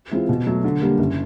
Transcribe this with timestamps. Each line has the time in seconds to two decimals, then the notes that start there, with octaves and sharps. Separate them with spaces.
0.11 E3 G#3 C4 F4
0.29 B2
0.47 F#3 A3
0.64 D3
0.81 G3 A#3
0.98 F#1